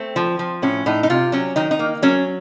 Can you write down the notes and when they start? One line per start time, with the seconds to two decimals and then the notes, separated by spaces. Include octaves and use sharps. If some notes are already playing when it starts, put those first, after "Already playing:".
Already playing: A3 C4
0.16 F3
0.39 F3
0.62 A2 C#4
0.86 A2 D#4
1.03 D#4
1.10 C3 F4
1.32 F#3 C#4
1.56 D#3 D#4
1.71 D#4
1.79 A#3
2.02 F#3 C#4